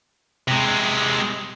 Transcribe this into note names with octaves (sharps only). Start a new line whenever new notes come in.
C3 G#3